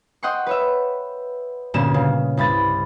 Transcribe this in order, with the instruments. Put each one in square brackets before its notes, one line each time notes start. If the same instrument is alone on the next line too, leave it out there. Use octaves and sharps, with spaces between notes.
[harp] D#5 F#5 G5 C6 C#6
B4 C#5 E5
D2 G2 A#2 B3 C#4 E7
C#3
C2 G2 B5 A6